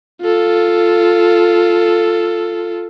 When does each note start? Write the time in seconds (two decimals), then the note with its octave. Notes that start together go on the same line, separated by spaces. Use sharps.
0.22 F4 A4